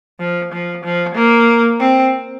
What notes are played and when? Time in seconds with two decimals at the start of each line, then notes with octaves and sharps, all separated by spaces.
0.20 F3
0.53 F3
0.84 F3
1.15 A#3
1.80 C4